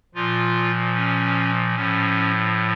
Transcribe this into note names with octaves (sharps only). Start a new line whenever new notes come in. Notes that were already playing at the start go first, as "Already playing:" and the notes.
A#2 F3 F4
C#4
A2 F3 C#4